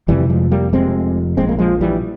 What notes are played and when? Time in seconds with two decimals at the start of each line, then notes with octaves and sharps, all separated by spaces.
0.08 F1 F2 C3 E3 G3
0.29 F3 G#3
0.51 G3 A#3
0.73 F1 F2 C3 G#3 C4
1.37 A#1 A#2 G#3 C4
1.49 A#3
1.59 F3 G#3
1.81 E3 G3